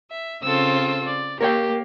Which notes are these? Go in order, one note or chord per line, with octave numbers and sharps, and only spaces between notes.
E5
C#3 C4 F4 A4 E6
D5
A#3 G4 A#4 C#5 G5